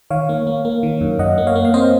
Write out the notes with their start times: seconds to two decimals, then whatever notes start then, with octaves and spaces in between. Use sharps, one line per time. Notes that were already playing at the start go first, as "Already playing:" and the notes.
0.10 D#3 C#5 F5
0.29 A#3
0.47 A#3
0.65 A#3
0.83 D#3
1.01 F#2
1.19 F#2 D#5 F#5
1.38 A#3
1.47 C#5 F5
1.56 A#3
1.65 F5
1.74 C4 C5 D#5